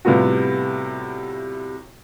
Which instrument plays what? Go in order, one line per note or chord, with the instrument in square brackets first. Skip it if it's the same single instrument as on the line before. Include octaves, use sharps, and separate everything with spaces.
[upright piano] A2 C3 G3 B3 F4 F#4